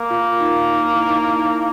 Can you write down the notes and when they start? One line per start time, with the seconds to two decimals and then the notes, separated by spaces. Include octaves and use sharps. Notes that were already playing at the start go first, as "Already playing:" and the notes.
Already playing: A#3
0.10 F4
0.41 D#4
0.71 D#4
0.94 E4
1.09 D#4
1.17 E4
1.39 D#4